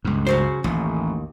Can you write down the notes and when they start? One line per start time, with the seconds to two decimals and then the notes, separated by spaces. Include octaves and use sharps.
0.05 C#2 G2
0.27 C#3 F#3 C5
0.64 A1 D#2